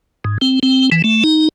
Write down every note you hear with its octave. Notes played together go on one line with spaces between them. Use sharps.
G#2
C4
C4
E3
A3
D#4